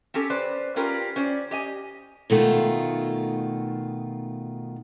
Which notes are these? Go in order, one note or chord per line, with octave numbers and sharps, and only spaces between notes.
C4 C#4 G4 A4
B4 C5 D5
C#4 F4 G4 A#4 B4
C#4 C5 D5
G4 D#5 G#5
B2 D#3 A3 F4